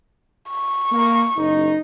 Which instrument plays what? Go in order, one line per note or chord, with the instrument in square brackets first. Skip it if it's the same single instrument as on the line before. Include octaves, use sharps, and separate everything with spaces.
[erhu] C#6
[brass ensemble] A#3
F#1 D#4